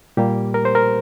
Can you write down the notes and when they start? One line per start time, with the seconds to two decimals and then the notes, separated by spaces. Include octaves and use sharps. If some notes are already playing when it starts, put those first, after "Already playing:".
0.17 A#2 G3 A#3 G4
0.54 A#4
0.65 C5
0.75 A#4